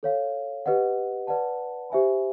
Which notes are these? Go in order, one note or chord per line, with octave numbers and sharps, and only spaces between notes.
A4 C#5 F5
G4 B4 D#5 F#5
B4 D5 F#5 A5
G4 C5 E5 G#5 B5